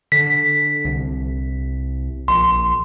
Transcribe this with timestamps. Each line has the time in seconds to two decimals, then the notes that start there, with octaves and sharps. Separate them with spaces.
0.12 D3 B6
0.85 C2
2.28 A#1 C6